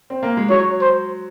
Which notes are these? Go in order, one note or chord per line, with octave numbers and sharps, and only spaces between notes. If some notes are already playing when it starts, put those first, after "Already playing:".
C4
A#3
G#3
F#3 C#5
C5